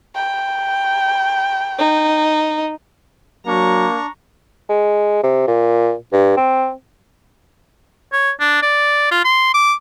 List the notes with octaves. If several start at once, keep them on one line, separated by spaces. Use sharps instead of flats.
G5
D#4
F#3 A#3 D4 A#5 C#6
G#3
C3
A#2
G2
C4
C#5
D4
D5
F4
C6
D6